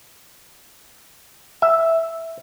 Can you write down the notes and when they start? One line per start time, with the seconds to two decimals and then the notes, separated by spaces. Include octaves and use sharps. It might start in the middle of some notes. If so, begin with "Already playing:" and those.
1.62 E5